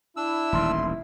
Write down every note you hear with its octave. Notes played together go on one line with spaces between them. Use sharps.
D4 E4 E6
D#1 A1 D#3 C6